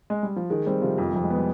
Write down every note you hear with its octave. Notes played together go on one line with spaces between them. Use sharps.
G#3
G3
F3
D#3 G#3
G3 C4
C3 F3
F2 F3
F2 G3
G#3
G3 B3